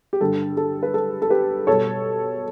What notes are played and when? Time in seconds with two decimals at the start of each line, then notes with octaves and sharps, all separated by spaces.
0.13 G4
0.21 G2 D3 G3 A4
0.57 A4
0.83 B4
0.94 A4
1.22 A4
1.30 G4 B4
1.67 B2 G3 A4 C#5